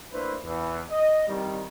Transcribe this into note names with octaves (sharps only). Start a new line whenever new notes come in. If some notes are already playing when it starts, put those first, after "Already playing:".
A3 A#3 D4 E4 B4 C5
E2
D#5
C2 C3 D#3 G3